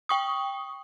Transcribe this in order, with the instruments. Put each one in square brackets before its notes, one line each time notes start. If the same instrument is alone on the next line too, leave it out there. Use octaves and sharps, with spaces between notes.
[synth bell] G5 C#6 D#6